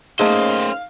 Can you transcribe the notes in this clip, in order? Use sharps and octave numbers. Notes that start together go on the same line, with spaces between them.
A3 A#3 C#4 D#4 G#4 C5 F5